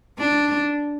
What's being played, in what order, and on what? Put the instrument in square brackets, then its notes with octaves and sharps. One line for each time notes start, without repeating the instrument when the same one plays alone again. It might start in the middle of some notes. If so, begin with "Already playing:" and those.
[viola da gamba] D4